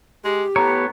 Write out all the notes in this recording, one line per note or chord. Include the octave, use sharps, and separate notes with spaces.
G#3 G4
A2 B3 C#5 A#5